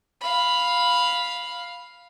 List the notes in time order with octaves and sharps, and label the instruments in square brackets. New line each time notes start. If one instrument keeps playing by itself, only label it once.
[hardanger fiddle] F5 B5